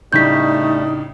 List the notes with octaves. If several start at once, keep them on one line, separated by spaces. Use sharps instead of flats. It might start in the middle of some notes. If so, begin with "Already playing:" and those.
A2 C#3 G3 A3 D4 D#4 G6 B6